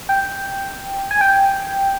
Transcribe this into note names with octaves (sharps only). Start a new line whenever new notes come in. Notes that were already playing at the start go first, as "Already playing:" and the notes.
G5
G#5
G5